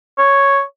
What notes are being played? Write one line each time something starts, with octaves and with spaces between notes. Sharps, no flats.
C#5